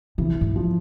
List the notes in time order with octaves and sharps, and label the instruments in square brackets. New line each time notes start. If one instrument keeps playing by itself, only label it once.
[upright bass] C3 [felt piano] E3
[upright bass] G#2
[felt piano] F3